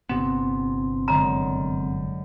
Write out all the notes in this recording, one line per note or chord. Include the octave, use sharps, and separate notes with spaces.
G1 C3 B3 C4
F#2 D3 G#3 A#5